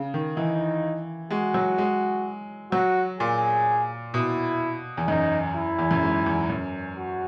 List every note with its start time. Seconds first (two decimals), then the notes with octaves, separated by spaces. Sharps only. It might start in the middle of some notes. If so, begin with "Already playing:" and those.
Already playing: C#3
0.14 D#3
0.37 E3 D#4
1.31 G#3 F#4
1.54 F#3
1.78 G#3
2.72 F#3 F#4
3.20 A#2 G#4
4.14 B2 E4
4.97 E2
5.08 F#2 D#4
5.55 E4
5.79 E2
5.91 F#2
6.03 G#2
6.26 E2
6.50 F#2
6.97 F#4